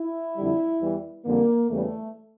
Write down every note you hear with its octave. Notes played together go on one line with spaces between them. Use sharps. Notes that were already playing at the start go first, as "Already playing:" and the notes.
Already playing: E4
F2 D3 G3
E2 E3 G3
F2 D3 G3 A#3
E2 C#3 E3 G3 A3